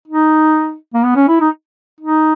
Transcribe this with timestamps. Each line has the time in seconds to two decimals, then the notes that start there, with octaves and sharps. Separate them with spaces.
0.08 D#4
0.94 A#3
1.04 B3
1.16 C#4
1.28 E4
1.41 D#4
2.00 D#4